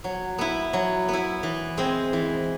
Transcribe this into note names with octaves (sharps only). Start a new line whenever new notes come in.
F#3
B3 E4
F#3
B3 E4
E3
G#3 C4
E3